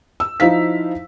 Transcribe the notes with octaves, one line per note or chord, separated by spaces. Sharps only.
E6
F3 D#4 E4 C5 F5 B6